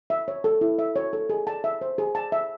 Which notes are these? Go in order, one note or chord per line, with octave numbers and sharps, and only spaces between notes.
E5
C#5
A4
E4
E5
C#5
A4
G#4
A5
E5
C5
G#4
A5
E5